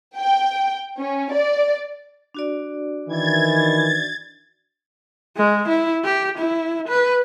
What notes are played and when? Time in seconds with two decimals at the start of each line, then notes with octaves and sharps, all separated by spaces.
0.17 G5
0.98 C#4
1.32 D5
2.34 D4 F#4 D5
3.08 D#3 E3 G#6 A6
5.37 G#3
5.68 E4
6.05 G4
6.38 E4
6.88 B4